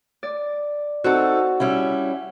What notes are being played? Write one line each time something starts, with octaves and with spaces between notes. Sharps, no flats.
D5
C4 D#4 F#4 A4
G3 C#4 E4